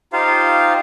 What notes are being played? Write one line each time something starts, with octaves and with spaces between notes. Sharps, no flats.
D#4 F4 G4 C5 F5